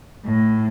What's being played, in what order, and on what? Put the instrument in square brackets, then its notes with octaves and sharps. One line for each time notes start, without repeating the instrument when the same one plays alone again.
[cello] A2